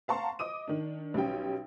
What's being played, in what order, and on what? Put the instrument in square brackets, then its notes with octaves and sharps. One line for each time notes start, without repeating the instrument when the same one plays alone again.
[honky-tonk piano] F5 F#5 A5 A#5 C6 C#6
D#5 D6 D#6 D#7
D#3 D4
B1 G3 C#4 G5